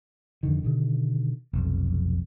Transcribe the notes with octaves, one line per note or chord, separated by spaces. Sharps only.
F2 D3 D#3
B2 D3 D#3
F1 B1 F2